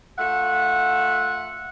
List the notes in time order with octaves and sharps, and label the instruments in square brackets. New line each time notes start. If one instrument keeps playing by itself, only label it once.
[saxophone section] A3 F4 E5 F#5